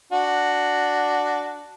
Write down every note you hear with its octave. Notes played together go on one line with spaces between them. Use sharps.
D4 F#4